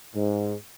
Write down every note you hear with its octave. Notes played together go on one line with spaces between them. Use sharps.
G#2